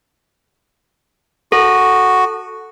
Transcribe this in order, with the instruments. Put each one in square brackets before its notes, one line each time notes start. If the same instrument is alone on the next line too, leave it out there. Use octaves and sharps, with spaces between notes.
[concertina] F#4 [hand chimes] A4